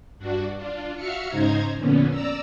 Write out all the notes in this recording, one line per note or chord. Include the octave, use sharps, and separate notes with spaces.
G2 D4 F#4
D4 F4
F#4 E5 F5 F6 C#7
G#2 C#3 D#4 C5 A#5 G#6
F2 A#2 D3 B3 C#4
D5 A#5 E6